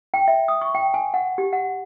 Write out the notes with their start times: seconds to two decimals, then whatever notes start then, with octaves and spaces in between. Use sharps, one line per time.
0.14 G5
0.28 E5
0.48 D#6
0.61 C#6
0.75 G5
0.94 G#5
1.14 F#5
1.38 G4
1.53 F#5